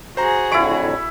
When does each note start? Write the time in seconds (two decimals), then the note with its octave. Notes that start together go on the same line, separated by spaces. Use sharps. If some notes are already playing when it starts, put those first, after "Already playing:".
0.17 F#4 G#4 C5 A#5
0.52 F2 A2 D3 E4 B5 C#6 D7